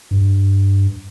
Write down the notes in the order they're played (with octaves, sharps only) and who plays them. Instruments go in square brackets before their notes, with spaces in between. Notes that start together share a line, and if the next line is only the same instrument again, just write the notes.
[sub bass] G2